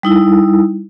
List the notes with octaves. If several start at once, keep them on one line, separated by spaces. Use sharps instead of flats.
G3 D#4 E4